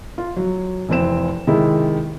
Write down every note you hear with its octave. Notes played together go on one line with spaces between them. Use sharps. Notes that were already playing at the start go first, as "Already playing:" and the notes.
F4
F#3
F1 E3 C4 E7
C3 D#3 G#3 E4